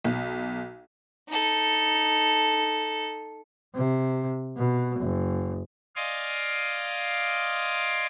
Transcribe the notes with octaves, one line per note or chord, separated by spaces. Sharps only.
B1
D#4 A4
C3
B2
F#1
D5 D#5 F5 G#5 C6 D6